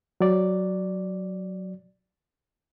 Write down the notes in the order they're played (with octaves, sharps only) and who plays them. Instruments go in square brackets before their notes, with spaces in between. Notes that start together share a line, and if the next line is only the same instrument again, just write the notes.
[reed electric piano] F#3 D5